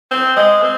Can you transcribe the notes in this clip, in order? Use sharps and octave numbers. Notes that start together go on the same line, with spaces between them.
C4
G#3
C4